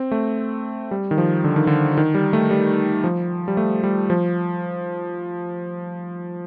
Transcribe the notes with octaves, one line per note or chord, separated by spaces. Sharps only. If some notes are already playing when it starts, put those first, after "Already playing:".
Already playing: C4
A3
G3
D#3
F3
D3
D#3
D3
D#3
G3
A3
G3
F3
G3
A3
G3
F3